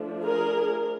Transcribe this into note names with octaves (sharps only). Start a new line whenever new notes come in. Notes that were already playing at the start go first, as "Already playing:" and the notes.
Already playing: F3 A3 D4
G#4 A#4